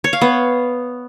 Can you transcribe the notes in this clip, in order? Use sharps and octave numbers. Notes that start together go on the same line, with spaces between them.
C#5
F5
B3